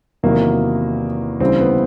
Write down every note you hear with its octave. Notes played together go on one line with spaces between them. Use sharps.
E2 C3 D#3 F#3 A#3
D2 C#3 E3 G3 C4
B3